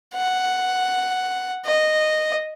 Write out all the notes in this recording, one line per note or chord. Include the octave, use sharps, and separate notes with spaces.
F#5
D#5